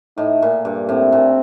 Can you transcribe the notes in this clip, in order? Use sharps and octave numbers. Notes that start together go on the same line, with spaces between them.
A2 D#4
A#2
G2
A2 C4
A#2